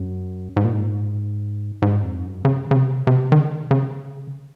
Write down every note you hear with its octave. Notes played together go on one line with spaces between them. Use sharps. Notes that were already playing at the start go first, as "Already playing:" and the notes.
Already playing: F#2
G#2
A#2
G#2
G#2
F2
F#2
C#3
C#3
C3
C3
D#3
C#3
C#3